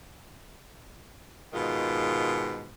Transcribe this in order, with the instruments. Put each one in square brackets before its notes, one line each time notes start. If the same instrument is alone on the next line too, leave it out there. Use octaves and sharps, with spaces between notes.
[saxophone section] G#2 B2 D#3 F4